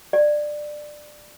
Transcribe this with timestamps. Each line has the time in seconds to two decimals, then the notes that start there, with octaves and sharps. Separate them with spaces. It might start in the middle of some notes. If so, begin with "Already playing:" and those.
0.13 D5